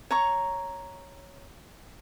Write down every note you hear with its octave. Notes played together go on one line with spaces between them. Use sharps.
C#5 A#5 C#6